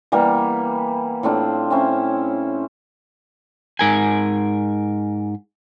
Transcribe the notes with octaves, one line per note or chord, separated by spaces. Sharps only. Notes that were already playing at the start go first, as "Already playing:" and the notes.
E3 G3 A#3 B3
A2 C4 D4 F4
C4 C#4 E4
G#2 A#4 G#5